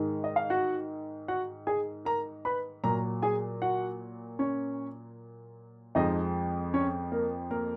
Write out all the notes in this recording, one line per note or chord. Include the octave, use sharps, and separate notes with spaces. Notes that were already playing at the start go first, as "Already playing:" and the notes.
Already playing: G#2 D#3 G#3
D#5
F5
F#4 F#5
F#4 F#5
G#4 G#5
A#4 A#5
B4 B5
A#2 F#3 A#4 A#5
G#4 G#5
F#4 F#5
C#4 C#5
F2 F3 G#3 D#4 D#5
C#4 C#5
A#3 A#4
A#3 A#4